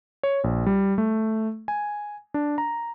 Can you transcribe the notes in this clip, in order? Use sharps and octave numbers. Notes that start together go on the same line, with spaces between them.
C#5
A#1
G3
A3
G#5
D4
A#5